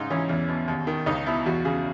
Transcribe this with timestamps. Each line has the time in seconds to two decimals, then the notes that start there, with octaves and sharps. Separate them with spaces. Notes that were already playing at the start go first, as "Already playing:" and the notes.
Already playing: G#2 C#3 D#4
0.10 E3 C#4
0.29 E2
0.48 B2
0.68 D#2
0.87 D#3
1.06 C#2 D#4
1.26 B2 E4
1.46 E2 F#4
1.65 C#3 G#4